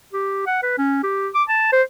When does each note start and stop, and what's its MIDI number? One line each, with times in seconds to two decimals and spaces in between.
0.13 0.43 67
0.46 0.58 78
0.63 0.73 71
0.78 0.99 61
1.03 1.28 67
1.34 1.43 86
1.49 1.72 81
1.72 1.82 72